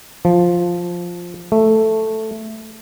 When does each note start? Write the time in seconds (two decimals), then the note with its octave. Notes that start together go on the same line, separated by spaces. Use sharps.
0.25 F3
1.52 A3